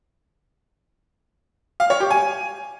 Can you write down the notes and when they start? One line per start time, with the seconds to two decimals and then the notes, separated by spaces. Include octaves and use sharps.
1.80 F5
1.90 C#5
2.00 G4
2.11 G#5